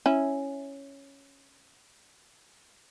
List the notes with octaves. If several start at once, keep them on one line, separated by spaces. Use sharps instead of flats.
C#4 E4